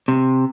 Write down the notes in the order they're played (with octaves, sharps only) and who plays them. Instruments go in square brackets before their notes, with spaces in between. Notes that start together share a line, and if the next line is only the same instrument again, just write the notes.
[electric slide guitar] C3